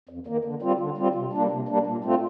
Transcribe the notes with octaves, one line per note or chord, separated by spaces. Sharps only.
F2
D#3 A#3
D3
G3 C4 F4
D3
G3 C4 F4
C3
G3 A#3 D4
C3
G3 A#3 D4
A#2
A3 C4 F4